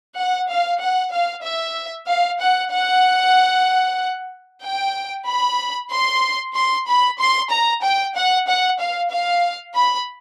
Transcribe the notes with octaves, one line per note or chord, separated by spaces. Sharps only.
F#5
F5
F#5
F5
E5
F5
F#5
F#5
G5
B5
C6
C6
B5
C6
A#5
G5
F#5
F#5
F5
F5
B5